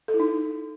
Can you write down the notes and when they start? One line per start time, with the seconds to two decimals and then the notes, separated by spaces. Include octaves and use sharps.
0.08 A4
0.14 E4
0.20 D#4